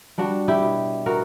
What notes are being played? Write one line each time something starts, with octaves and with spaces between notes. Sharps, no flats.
G3 D4 F#4
E4 G4
B2
B3 F#4 A#4